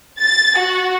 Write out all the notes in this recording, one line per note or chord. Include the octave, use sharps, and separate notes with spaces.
A6
F#4